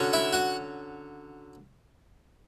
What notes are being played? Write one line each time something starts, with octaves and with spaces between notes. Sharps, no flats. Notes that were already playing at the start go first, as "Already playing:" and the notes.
Already playing: D3 F#3 C#4
E4 E5
F#4 F#5